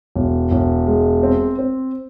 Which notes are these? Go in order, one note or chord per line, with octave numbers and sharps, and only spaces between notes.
E1
E1
G#3
C4
C4